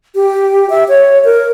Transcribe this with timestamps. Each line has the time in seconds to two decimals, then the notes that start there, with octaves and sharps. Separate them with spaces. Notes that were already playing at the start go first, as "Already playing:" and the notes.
0.15 G4
0.70 E5
0.88 C#5
1.25 A#4